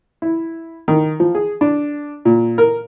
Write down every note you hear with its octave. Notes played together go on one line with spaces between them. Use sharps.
E4
D#3
F3
G#4
D4
A#2
A#4